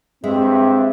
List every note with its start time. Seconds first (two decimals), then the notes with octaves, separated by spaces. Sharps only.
0.24 G2 G#3 C4 E5